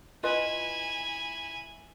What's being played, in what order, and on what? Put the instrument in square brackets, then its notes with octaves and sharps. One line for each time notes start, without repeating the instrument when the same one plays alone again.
[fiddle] E4 G#5 [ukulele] F4 B4 D#5